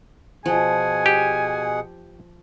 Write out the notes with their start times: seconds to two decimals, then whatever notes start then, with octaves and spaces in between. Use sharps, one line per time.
0.46 B2 F3 G#4 F#5 G#5
1.06 G4